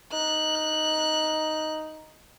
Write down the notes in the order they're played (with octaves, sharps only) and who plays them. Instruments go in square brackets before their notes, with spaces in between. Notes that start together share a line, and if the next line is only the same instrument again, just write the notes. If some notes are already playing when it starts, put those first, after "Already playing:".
[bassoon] D#4 [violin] F#6